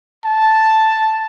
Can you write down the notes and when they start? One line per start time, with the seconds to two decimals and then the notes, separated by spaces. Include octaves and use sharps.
0.25 A5